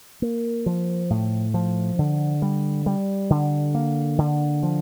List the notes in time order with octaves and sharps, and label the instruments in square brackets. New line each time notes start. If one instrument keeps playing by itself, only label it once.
[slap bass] A#3
F3
A2
F3
D3
G3
G3
D3
A#3
D3
F3